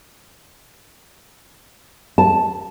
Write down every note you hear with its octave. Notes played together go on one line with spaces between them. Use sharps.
A5